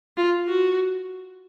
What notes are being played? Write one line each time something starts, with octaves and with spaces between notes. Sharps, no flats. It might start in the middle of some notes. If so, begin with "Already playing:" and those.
F4
F#4